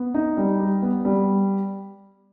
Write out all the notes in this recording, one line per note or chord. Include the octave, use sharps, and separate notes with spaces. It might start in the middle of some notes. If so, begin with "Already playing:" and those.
Already playing: B3
D#4
G3
G4
B3
G3